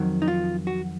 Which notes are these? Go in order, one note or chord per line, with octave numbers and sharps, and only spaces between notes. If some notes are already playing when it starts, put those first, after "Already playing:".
Already playing: F2 D#3 F#3
D#4
F4
F#4